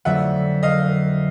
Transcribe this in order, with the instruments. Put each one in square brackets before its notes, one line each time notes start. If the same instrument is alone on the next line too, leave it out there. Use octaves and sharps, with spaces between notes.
[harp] F2 D3 F#3 A3 [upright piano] E5 F#5
[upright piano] D#5 F5